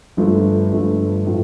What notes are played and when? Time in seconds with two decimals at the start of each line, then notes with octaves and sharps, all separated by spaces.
0.17 G1 G2 F3 A3
0.71 G1 G2 F3 A3
1.26 A2 F3